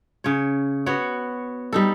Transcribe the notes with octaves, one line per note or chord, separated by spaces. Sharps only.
C#3 C#5
B3 F#4 C#5
G3 D#4 A4